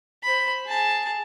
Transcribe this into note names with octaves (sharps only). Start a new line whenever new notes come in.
C5 B5
G#4 A5